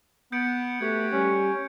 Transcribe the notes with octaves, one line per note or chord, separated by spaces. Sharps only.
B3 G6 C#7 D7
A3 F#4 G4 B4 G#6
G3 C#4